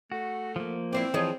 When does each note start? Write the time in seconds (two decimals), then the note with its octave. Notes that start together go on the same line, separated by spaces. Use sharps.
0.12 A3 F#4
0.56 F3 A#3
0.93 C4 E4 C5 D5
1.14 E3 F3 G#4 C#5 D#5